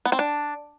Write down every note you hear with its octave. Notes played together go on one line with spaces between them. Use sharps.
B3
C4
D4